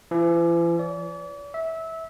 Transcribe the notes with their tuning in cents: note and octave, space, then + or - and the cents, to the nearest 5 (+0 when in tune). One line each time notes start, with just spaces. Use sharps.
E3 +45
D5 -40
E5 -20